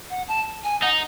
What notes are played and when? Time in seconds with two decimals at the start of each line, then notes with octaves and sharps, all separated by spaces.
0.10 F#5
0.28 A5
0.64 G#5
0.82 D#4 F#5